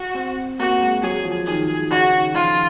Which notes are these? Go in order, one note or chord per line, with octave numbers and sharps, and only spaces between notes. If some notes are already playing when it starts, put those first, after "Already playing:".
Already playing: F#4
C4
A#3 F#4
G#3
F#3 G#4
F3
D#3 G#4
D#3
C#3 F#4
D#3
F3 F4